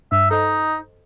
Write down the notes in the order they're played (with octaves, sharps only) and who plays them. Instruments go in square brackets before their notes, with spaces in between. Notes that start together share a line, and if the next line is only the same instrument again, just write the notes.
[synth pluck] G2 [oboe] E5
[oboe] D#4 [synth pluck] A4 C5 D#5